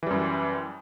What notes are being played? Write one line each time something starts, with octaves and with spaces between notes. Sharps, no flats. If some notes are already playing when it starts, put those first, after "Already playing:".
F#2 E3 G3